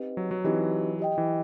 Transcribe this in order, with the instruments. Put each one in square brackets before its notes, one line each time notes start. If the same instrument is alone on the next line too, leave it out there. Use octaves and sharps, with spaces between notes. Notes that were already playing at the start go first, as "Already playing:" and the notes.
Already playing: [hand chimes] C4 D#4 G4 B4 D#5
[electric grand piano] F#3
F#3
[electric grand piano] E3 [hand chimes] C4 D#4 G4 B4 D#5
[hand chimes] G4 D#5 G5
[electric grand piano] E3